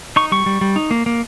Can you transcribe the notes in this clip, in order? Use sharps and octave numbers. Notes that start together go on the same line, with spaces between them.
D#4 C#6
G3 C#6
G3
G3
D#4
A#3
A#3